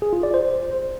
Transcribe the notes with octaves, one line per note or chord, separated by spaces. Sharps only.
G#4
F4
D5
C5